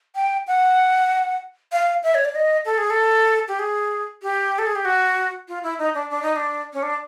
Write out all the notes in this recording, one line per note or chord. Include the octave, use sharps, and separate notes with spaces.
G5
F#5
F5
E5
C#5
D5
D#5
A4
G#4
A4
G4
G#4
G4
A4
G#4
G4
F#4
F4
E4
D#4
D4
D4
D#4
D4
C#4
D4